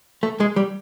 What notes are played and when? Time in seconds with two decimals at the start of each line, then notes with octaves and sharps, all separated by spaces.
0.23 A3
0.40 G#3
0.56 G3